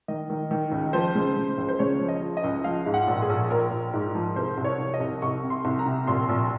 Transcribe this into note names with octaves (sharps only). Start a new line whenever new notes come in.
D#3 D#5
D#3
D#3
C#2
F3 C5
C#3
C#3
C#2
C5
C#3 C#5
F3
D#5
F3
D#5
C#2
F3 F5
G#2
F#5
A#1
G#4
A#1
A#1 A#4
A#1
G#2
F3
C2 C5
C2
C#5
C2
D#5
C2
C2 C#6
C3
C6
C2
A#5
C3
A#1 C6
A#1